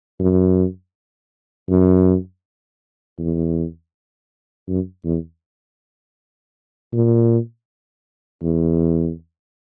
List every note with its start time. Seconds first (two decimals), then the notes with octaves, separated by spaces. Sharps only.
0.20 F#2
1.70 F#2
3.19 E2
4.68 F#2
5.05 E2
6.93 A#2
8.43 E2